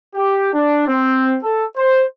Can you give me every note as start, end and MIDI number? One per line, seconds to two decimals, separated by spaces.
0.15 0.50 67
0.53 0.87 62
0.88 1.37 60
1.44 1.65 69
1.77 2.03 72